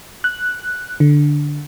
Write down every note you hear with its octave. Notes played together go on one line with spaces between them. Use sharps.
F#6
D3